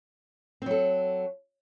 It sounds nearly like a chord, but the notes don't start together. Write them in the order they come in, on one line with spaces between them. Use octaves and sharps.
C4 F#3 A4